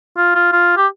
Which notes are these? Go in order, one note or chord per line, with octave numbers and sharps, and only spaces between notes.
F4
F4
F4
G4